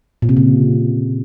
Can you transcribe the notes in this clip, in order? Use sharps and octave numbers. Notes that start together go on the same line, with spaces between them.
A#2
C3
C#3